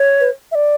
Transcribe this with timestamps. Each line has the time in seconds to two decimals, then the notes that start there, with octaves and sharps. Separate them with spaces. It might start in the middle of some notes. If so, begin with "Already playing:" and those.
Already playing: C#5
0.20 B4
0.52 E5
0.55 D5